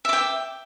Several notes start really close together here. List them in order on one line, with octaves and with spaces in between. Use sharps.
E5 D6 G5